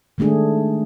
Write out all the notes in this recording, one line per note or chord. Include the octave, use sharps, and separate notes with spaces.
D#3 G#3 A3 D4 G#4